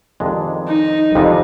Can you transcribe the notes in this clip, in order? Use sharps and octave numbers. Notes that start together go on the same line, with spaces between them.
F2 C3 D#3 G#3 D4
D#4
F2 C3 D#3 G#3 D4